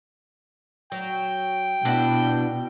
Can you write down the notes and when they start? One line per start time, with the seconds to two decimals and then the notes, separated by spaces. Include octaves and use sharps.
0.92 F#3 G5
1.85 B2 D4 E4 F#4